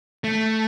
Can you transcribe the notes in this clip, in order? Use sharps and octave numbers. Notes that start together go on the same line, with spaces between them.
A3